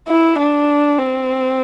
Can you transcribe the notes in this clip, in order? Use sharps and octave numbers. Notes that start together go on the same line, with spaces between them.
E4
D4
C4